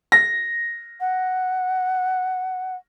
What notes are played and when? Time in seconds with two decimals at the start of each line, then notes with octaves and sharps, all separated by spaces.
0.12 A#6
1.00 F#5